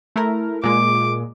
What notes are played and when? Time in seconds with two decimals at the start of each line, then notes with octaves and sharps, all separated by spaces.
0.16 A3 E4 A#4
0.64 A#2 G#3 D6